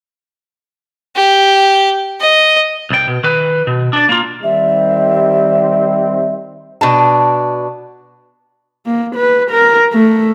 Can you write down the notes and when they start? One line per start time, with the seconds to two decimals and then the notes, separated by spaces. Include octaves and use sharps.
1.16 G4
2.20 D#5
2.90 C2 G5
3.08 B2
3.24 D#3 B4
3.67 B2
3.93 D4 D5
4.09 A#3 F4
4.43 D#3 G3 C4 E5
6.81 B2 D4 A5
8.86 A#3
9.16 B4
9.51 A#4
9.93 A3